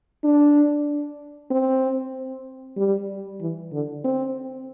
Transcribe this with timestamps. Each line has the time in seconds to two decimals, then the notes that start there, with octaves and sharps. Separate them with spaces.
0.24 D4
1.51 C4
2.77 G3
3.41 E3
3.73 D3
4.04 C4